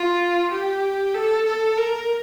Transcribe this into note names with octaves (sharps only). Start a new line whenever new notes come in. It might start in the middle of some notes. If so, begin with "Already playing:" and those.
Already playing: F4
G4
A4
A4
A#4